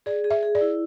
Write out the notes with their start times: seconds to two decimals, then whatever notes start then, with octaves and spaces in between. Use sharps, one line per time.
0.06 G#4 D5
0.24 G#4
0.31 E5
0.43 G#4
0.55 D5
0.61 E4